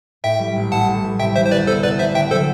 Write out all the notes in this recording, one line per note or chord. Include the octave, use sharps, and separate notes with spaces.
A2 E5 G5
G3
A1
A1 F#5 A5
A2
G3
C3 E5 G5
E3 C5 E5
C5
D2 B4 D5
B3 A4 C5
C3 B4 D5
E3 C5 E5
D3 E5 G5
F#3 A4 C5